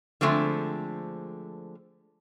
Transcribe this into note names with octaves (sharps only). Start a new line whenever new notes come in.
D3 F3 G#3 A3 C4